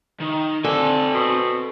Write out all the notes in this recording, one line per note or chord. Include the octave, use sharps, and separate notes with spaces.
D#3
D3 C4 A4 G#5
B2